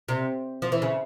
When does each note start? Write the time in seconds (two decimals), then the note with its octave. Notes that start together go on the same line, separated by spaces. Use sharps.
0.08 C3
0.62 F3
0.72 E3
0.82 C#3